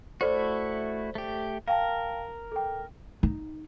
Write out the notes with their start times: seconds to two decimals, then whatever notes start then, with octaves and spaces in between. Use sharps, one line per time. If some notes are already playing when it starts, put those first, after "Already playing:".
0.21 A3 E4 F#4 A4 C5 D5
1.15 A3 G4
1.68 A#4 F5 G5 A5
2.52 A4 G5
3.23 D#4